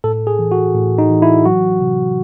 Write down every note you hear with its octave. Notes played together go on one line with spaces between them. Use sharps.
A2 A4
G#4
E3
F#4
A2
D#4
E3
E4
F#3 F#4
C3